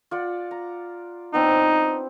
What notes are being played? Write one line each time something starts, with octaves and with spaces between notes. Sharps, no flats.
F4 D5 F#5
A#5
B3 C4 D4 D#4